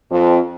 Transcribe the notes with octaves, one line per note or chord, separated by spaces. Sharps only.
F2